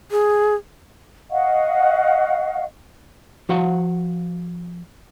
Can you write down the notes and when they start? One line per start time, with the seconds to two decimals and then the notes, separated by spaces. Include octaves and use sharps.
0.11 G#4
1.30 D#5 F5 F#5 C#6
3.49 F3 F#4 C5 F5 F#5